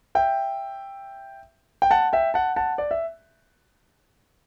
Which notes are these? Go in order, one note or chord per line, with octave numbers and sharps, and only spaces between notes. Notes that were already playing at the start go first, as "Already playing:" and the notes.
E5 G5
G5
F#5 A5
E5 G5
F#5 A5
F#5 A5
D5
E5